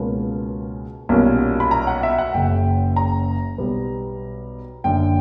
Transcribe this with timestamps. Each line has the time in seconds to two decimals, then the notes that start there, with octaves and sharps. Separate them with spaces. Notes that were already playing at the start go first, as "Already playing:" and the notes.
Already playing: C#2 B2 A#3 C#4
1.09 B1 A#2 G3 A#3 C#4
1.60 B5
1.71 A#5
1.87 F#5
2.03 E5
2.18 F#5
2.34 F#1 F#2 C#3 G5
2.96 A#5
3.58 B1 B2 G3 B3
4.84 F#1 F#2 D3 G5